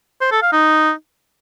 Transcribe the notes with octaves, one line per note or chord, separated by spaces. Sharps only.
C5
A4
F5
D#4